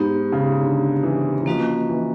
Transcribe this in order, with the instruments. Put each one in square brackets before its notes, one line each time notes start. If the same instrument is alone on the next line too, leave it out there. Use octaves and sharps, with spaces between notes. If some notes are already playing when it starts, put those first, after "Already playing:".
Already playing: [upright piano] G#2 [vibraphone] B3 D#4 G4
[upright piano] C#3
D3
E3
E3
[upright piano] F3 [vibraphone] A#3 C#4 F#4 B4 D#5
[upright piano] E3